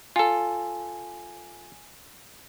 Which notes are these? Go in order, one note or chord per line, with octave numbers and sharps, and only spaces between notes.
F4 A4 G#5